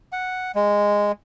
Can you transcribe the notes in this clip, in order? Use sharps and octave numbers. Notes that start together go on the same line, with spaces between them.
F#5
G#3